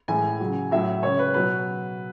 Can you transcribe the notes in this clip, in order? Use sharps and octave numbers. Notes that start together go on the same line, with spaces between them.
A2 E3 G#3 G#5
C#3 F#3
A2 F#3 E5
C#3 G#3 C#5
B4
B2 F#3 B4